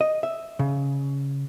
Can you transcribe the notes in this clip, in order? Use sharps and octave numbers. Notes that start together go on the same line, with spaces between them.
D#5
E5
C#3